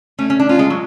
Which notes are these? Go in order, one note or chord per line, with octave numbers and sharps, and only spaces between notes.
A3 C#4
C#4
D4
C#4 F4
G#3
F#3